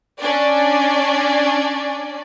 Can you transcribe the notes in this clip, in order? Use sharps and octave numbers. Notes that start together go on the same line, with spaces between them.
C#4 D4 D5